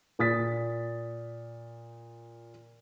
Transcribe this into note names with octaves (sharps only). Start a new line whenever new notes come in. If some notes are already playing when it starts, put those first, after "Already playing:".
A#2 D#6 A6 B6